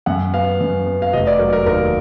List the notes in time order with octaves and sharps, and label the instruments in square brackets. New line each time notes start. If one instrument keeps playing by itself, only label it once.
[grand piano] F#2 F#5
B3 F5
F#2
B3
F5
F1 D#5
D5
F#3 A#4
A#4
D#2 A#4